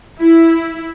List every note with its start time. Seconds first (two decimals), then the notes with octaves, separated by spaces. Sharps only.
0.20 E4